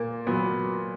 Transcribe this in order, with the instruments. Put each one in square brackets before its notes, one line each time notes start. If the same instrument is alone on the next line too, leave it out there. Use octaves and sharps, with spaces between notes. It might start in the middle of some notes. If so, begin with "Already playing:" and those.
Already playing: [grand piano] A#2 A#3
A#2 F#3 B3